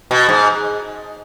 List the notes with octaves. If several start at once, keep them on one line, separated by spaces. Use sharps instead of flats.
B2
G#2